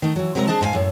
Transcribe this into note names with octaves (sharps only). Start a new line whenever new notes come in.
D#3 A3 D#4
E3 F#3
C3 F#3 G#3 A#4 D5 A#5
D4 G#4 C5 D#5 A5
G#2 G4 B4 F5 G#5
F#2 A2